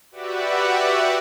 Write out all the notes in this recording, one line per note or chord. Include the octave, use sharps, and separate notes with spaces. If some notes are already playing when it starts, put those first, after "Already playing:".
F#4 G4 B4 D5 E5 F#5